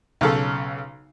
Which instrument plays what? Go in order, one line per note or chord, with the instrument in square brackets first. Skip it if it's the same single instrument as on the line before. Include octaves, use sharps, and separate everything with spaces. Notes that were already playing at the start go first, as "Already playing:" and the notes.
[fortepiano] B1 C#3 A4